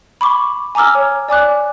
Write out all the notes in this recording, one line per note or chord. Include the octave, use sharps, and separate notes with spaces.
B5 C#6 D6
G#5 A#5 D6 E6 F6
C#5
D5 G#5 D6 F#6